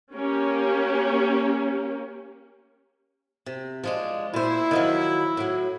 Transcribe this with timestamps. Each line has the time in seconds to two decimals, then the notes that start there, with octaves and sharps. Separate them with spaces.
0.14 A#3 C#4 G4
3.46 C3
3.84 F3 G#3 D4
4.34 A#2 E4 C5
4.71 D#3 F3 F#3
5.37 A2 F#3